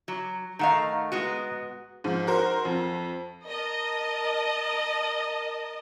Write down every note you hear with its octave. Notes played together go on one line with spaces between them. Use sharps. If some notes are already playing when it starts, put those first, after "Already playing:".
F#3
D#3 A3 D#5 F5 F#5 A#5
G#3 B3 F#4
G#2 F3
F#4 A#4 C5
F2
A#4 D#5 A5